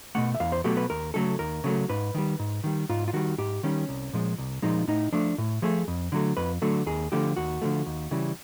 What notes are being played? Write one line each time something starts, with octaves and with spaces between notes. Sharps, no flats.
B2 F#3 A3 F#5
E5
E2 F5
C5
B2 F#3 A3 G4
B4
D#2 A#4
C#3 F#3 A3 A4
D#2 A#4
C#3 F#3 A3
G#2 B4
D#3 G3
G#2
D#3 G3
G#2 F4
F4
D#3 G3 F#4
G#2 G4
D#3 G3 C#4
C2
A#2 F3 G#3
C2
A#2 F3 G#3 D#4
A2 D#4
F3 A3 D4
A2
F3 A3 G#4
F2
D3 F#3 A3
F2 B4
D3 F#3 A3
D#2 G#4
D3 F3 A3 G4
D#2 F#4
D3 F3 A3
D#2
C#3 E3 G3